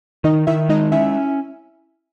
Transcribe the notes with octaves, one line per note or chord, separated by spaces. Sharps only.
D#3 D#4 D#5
D#3 E4 E5
G#3 D#4 D#5
C#4 E4 E5